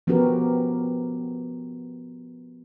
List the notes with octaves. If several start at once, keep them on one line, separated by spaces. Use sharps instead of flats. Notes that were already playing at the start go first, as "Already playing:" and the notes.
F3 B3 C#4 F#4 G4 A#4